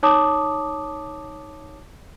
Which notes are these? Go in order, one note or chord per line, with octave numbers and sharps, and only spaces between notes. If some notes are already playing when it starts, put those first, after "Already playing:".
D#4 C#5 A5 D6 D#6